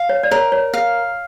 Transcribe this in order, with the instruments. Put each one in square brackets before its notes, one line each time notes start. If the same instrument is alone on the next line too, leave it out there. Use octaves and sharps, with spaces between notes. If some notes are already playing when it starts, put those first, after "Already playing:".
Already playing: [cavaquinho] F5
[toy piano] C#5
D5
[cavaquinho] A#4 [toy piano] C#5
[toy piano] C#5
[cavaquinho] F5